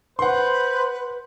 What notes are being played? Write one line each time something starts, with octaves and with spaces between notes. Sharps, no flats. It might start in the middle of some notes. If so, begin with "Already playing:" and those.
B4 C5 F#5 C6